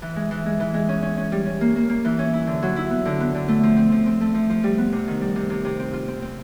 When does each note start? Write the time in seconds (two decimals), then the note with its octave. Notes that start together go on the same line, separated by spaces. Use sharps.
0.02 E3
0.16 G#3
0.31 E3
0.46 G#3
0.60 E3
0.74 G#3
0.89 C#4
1.03 C#4
1.17 C#4
1.32 G3
1.46 C#4
1.61 A#3
1.76 A#3
1.89 A#3
2.05 E3
2.19 C#4
2.33 E4
2.47 D3
2.63 F#3
2.76 E4
2.91 B3
3.05 D3
3.20 B3
3.35 D3
3.48 A3
3.63 F3
3.77 C4
3.92 F3
4.06 C4
4.21 A3
4.34 F3
4.50 F3
4.64 G3
4.78 B3
4.92 C3
5.08 D#3
5.21 G3
5.36 C3
5.50 C3
5.65 C3
5.80 C4
5.93 F4
6.08 C4
6.22 C4